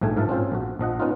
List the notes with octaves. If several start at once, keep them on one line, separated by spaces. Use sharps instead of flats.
A#1 G#2 A3 G5 G#5
G#2 F3 A#4 E5 A5
C4 C#4 F4 C5
A#1 F#4
A#1 F3 D#5 F#5
B3 C#4 D#4 F4